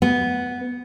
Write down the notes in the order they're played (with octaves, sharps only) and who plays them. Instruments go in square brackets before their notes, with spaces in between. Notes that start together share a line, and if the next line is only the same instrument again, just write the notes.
[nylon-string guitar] B3